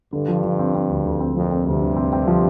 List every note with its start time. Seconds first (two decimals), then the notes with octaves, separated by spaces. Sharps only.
0.13 G2 D3
0.28 F3
0.44 F3
0.59 C4
0.75 C4
0.89 D2
1.05 D2
1.20 C4
1.36 F2 A#2 F3
1.51 C4
1.66 D2 G2 C3
1.82 D3
1.97 C4
2.13 C4
2.28 F3